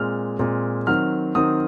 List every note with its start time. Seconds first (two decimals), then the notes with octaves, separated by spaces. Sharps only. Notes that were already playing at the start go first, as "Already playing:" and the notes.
Already playing: A#2 G#3 C4 F6
0.39 A#2 G#3 C4
0.87 D#3 F#3 C4 F6
1.35 D#3 F#3 C4 D#6